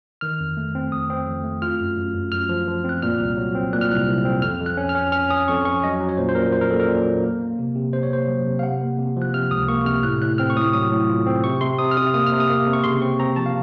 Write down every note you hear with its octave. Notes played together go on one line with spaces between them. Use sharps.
D#3 F6
F2
A3
C4
F2 D#6
C4
F2
A3
F4 F6
F#2
F#2
F#2
F#2 F6
F3
F3
C4 F#6
A#2 F6
C2
F#3
C4
A#2 F#6
F6
C2 F#6
C2
C4
F2 F6
F2
F#6
C#4
F6
C#4
C#4 F6
C#4 D#6
F2 C#6
C#4 C#6
F#3 D#5
F#3
C#5
A#2 C5
C5
A#2 A#4
A#2 C5
A#4
A#2 A4
A#4
A#2
F#3
A#3
A#3
C3
C3
C3 C5
C#5
A#3 C5
F#3
C3
F5
C3 F#5
A#3
C3
F3
F#6
C3 F6
C#2 D#6
A#3 C#6
C3 F6
A2 F#6
A2 F#6
C4 F6
C#6
A2 D#6
F#3 D#6
A2
F4
C4
C3 C#6
C3 C6
C3 D#6
F6
C3 D#6
A#3 D#6
F6
C3
D#6
A#3
C3
C#6
C#3 C6
C4 C#6
C4 A#5
F3 A5
F5